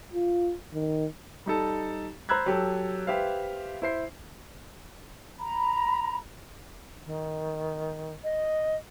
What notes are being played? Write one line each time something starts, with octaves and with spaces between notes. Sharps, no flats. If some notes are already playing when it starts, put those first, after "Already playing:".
F4
D#3
G3 D#4 A4
C5 A#5 B5 E6 F#6 G#6
F#3 G4 A4
G4 B4 C5 E5 F5
E4 C5 C7
A#5 B5
D#3
D#5